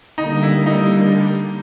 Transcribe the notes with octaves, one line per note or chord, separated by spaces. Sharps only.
D3 G3 A#3 D#4
E4
D#4